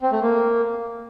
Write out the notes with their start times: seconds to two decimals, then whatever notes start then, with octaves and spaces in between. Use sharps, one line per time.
0.01 C4
0.12 A3
0.22 A#3